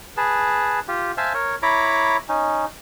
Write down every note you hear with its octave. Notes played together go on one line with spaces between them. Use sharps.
G#4 B4 A5
F4 G4
C5 E5 F5 G#5 A5
A#4 C#5
E4 C#5 A#5 B5 D6
C#4 D#4